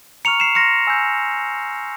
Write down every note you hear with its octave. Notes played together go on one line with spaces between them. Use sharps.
A#5 C#6 F6 C#7 F7
C7 E7
C6 F6 A#6 C#7
G#5 E6 G6